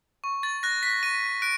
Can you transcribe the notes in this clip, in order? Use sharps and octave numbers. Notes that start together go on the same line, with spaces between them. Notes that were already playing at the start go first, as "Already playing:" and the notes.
C#6
A6
F#6 A#6
B6
C#6 D#7
F#6 D7